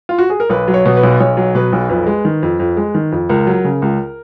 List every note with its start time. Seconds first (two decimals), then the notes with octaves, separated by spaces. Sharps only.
0.09 F4
0.18 F#4
0.30 G#4
0.40 A#4
0.50 B1 B4
0.68 F#3
0.74 C#5
0.86 B2
0.97 B4
1.03 B1
1.20 B1 C#5
1.37 F#3
1.55 B2 B4
1.73 B1
1.89 F2 B4
2.07 G#3
2.25 D#3
2.43 F2
2.60 F2
2.77 G#3
2.95 D#3
3.12 F2
3.29 C#2 A#4
3.47 F#3
3.65 C#3
3.82 C#2